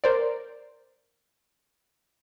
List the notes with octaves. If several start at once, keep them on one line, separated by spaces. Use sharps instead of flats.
A#4 C5 D5